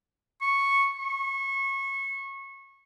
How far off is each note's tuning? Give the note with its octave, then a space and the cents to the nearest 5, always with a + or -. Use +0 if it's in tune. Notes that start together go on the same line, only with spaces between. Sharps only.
C#6 -5
C#6 -25